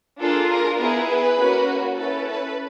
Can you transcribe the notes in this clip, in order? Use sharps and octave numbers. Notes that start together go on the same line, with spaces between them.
A#3 D4 F4 G#4 A4
A#4
B3 E4 G#4 A#4
B4
A#3 C#4 F#4
C#4 E4 A4 B4
B4